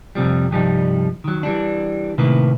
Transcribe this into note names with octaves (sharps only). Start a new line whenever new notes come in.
F2 C3 F3 G3
C2 G2 F3 G3 D#4
D#3 F#3
E3 G3 D4
A2 C3 D#3 A#3 B4